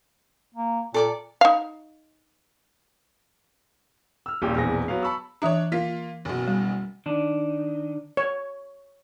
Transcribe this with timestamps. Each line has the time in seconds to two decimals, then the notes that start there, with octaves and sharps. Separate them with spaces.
0.55 A#3
0.94 A#2 A4 D5 D6
1.41 D#4 F5
4.26 E6 F6
4.42 D#1 A#1 A#2 G3 G4
4.55 E1 A#1 E2 C4 A#6
4.88 F#3 B3 F5
5.03 A5 B5 C#6 E6
5.42 E3 D4 C#5 E5 A#5
5.72 A#3 F4 B6
6.25 F#1 B2
6.48 G3
7.06 D#3 D4
8.17 C#5